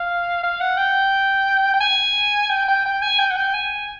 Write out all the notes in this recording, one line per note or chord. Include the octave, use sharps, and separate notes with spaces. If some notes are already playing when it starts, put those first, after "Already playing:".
Already playing: F5
F5
F#5
G5
G5
G#5
G5
G5
G5
G#5
G5
F#5
G5
G#5